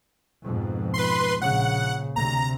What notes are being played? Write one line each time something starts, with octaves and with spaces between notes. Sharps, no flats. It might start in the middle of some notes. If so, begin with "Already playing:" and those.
F2 G#2 B2
B4 C6
A#1 C#3 F#5
D2 C3 A#5